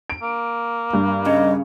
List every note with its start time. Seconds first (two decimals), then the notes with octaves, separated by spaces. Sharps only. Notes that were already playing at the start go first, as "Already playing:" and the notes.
0.10 D7
0.22 A#3
0.93 G2
1.26 C#3 D#5